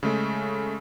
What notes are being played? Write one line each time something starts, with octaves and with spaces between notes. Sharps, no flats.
C#3 G#3 A3